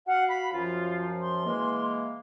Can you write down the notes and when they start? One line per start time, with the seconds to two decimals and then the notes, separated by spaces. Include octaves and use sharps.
0.07 F#4 F5 F#5
0.29 B5
0.53 F#2 F3 F4
1.21 C6
1.46 E3 G#3 A#3